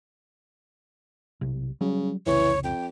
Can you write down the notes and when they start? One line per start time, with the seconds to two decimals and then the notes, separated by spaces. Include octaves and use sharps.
1.41 B1 C3
1.81 C#3 F#3 G3
2.26 F1 C2 C#3 E3 C#5
2.64 F2 G5